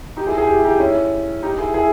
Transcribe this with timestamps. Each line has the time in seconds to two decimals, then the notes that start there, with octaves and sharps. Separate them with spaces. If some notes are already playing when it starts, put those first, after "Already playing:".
0.17 D#4 G4
0.27 E4 G#4
0.38 G#4
0.47 G4
0.56 E4
0.64 D#4 G4
0.80 C#4 E4
1.43 D#4 G4
1.58 E4 G#4
1.74 E4 G#4